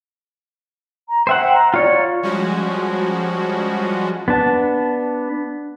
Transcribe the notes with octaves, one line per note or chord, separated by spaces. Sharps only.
A#5
C5 E5 F#5 G5
A#5
F4 C#5 D5
F3 G3 G#3 C#4 F#4
B3 D4 A5